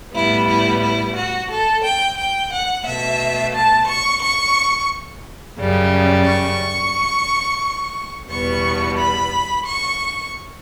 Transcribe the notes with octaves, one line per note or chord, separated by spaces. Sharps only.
A2 G3 B3 E4
E4
E4
F#4
A4
G5
G5
F#5
B2 A3 E5
A5
C#6
C#6
F#2 C#3 G3
C#6
E2 B2 G3 B3 C#6
B5
C#6